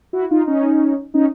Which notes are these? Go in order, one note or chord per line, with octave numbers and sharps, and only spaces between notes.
E4 F#4
D#4 F4
C#4 D#4
C#4 D#4